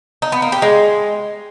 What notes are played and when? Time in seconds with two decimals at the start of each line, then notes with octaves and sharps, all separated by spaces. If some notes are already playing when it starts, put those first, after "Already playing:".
0.22 D#4
0.32 B3
0.42 A#3
0.52 G4
0.62 G#3